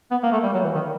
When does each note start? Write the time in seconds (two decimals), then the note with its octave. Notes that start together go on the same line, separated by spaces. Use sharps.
0.11 B3
0.23 A#3
0.32 A3
0.43 G3
0.54 F#3
0.64 E3
0.75 D#3